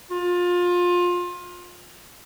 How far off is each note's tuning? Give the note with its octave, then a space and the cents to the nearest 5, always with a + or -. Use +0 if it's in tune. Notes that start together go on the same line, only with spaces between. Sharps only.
F4 +25